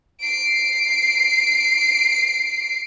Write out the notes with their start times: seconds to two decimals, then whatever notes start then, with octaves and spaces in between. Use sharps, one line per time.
0.21 C7 D7